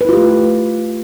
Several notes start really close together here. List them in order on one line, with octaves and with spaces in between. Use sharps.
B4 E4 F4 G4 A3